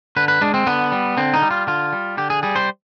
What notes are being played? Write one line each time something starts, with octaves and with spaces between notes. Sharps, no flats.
D3 B4
B4
G#3 D4
C4
D3 B3
G3
D3 C4
D#4
G3
F4
D3 F4
G3
D3 G4
G#4
G3 G#4
C5